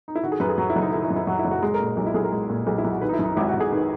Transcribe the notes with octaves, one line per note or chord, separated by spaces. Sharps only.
D#4
E4
D#3 F#4
G#4
F#2 B4
G#4
F#3
E4
F#1
D#4
D#3 E4
E4
F#2
E4
F#3 F#4
E4
F#1
F#4
G#3 G#4
A#4
A#2
A#4
B1 D#4
E4
B1 G#4
A#4
G#3
A#2
B1 G#4
E4
B1
F#4
D#3 B4
D#4
E4
F#2
D#4
G#1 E4
F#4
G#1
G#4
D#3 B4